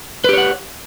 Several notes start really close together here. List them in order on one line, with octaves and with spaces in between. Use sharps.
B4 G4 C#5 F#5